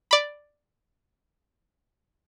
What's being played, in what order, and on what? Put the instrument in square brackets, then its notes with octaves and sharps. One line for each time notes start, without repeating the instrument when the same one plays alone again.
[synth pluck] D5 B5